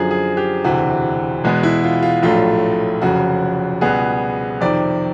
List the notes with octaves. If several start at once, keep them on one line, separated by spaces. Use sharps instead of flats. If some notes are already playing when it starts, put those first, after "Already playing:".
Already playing: F#2 D3 F3 G#4
G#4
G4
E1 D2 C3 E3 F#4
E2 B2 G#3 B3
E4
F4
F4
A#1 A2 F#3 A3 F4
F1 F2 C#3 F#3 F#4
C#2 B2 G3 B3 G#4
F2 C3 D#3 D5